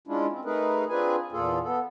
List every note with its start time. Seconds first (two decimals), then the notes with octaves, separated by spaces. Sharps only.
0.08 G#3 C#4 D4 E4 F4
0.32 C4
0.45 A3 D#4 G#4 A#4 B4
0.89 C4 D4 F4 G#4 B4 G#5
1.32 E2 A#2 A#3 F4 G#4 A4
1.64 B3 A4